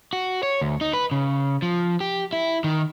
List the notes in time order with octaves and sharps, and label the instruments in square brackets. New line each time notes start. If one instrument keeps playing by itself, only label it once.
[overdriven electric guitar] F#4
C#5
D2
D#4
B4
C#3
F3
G4
E4
D#3